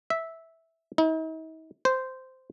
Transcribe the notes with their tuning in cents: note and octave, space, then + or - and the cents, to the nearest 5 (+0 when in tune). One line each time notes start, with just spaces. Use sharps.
E5 -10
D#4 +45
C5 -10